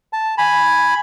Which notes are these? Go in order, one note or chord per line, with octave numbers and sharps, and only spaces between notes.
A5
G#5 B5